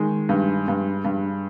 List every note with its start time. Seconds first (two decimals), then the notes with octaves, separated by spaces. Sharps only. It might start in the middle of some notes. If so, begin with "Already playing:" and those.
Already playing: D#3 G#3
0.29 G2
0.68 G2
1.05 G2